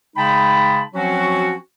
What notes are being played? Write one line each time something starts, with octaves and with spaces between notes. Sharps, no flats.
C#3 G#3 D#4 G5 A5 B5
F3 F#3 C4 C#4 F#4